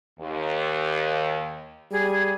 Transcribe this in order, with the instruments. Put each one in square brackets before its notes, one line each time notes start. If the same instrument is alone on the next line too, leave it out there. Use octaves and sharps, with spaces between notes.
[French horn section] D#2
[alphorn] G3 [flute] G#4